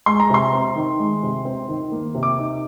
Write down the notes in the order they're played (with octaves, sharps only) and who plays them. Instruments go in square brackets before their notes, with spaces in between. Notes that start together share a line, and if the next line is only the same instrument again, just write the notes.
[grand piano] G#3 C6
A#5
C3 C6
C4
D#3
G#3
C3
C4
D#3
A#3
C3
D6
D#4